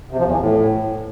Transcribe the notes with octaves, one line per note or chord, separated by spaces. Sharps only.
C3
F3
E2
E3
A2